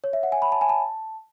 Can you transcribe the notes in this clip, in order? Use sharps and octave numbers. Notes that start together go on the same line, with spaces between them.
C#5
E5
F#5
G#5
B5
A5
G#5
A5